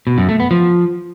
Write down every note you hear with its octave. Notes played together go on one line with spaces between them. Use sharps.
B2
F#2
A3
B3
F3